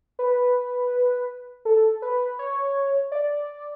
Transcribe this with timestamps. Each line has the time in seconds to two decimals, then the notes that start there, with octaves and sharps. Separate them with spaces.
0.19 B4
1.65 A4
2.02 B4
2.39 C#5
3.12 D5